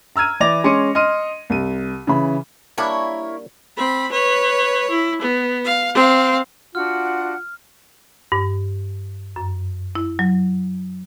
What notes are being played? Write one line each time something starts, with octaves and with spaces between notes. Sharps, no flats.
A#5 E6 F6 G#6 D#7
E3 D5 D6 A#6 F7
G#3 C#4 C6 D6 C#7 D#7
D#5 C6 F6 D#7
C2 D#7
C#3 E3 B5
G3 A#3 D4 E4 A#4 C#5
C4 B5
B4 C#5
E4
B3
F5
C4 F5
D4 F4 F#4 F#5 F6
G2
F#2
E4
F#3